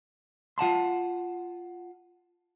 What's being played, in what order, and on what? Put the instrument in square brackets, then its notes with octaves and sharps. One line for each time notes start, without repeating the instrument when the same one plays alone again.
[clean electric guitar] F4 F#5 A5 C6